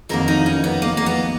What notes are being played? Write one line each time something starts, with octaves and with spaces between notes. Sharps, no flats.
F2 D#3 F#3 A#3 A#4
D#4
C#4
B3
A#3
A#3
B3